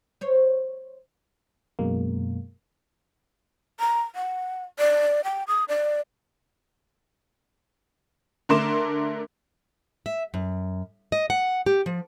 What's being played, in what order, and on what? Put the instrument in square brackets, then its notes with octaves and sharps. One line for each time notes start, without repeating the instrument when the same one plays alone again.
[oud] C5 C#5
[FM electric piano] F#2 B2 G#3 A#3
[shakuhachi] A#5
F#5
D5
G5
D#6
D5
[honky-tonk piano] D3 A3 A#4 C6 D6 E7
[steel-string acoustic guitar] E5
F#2
D#5
F#5
G4
F3